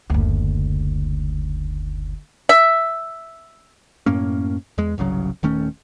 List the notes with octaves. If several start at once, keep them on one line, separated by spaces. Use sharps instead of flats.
F#1 D2
E5
F#2 A2 A#3 C#4
E2 G#3
G1 C2 C#3 F#3
D#1 D#3 A3 C#4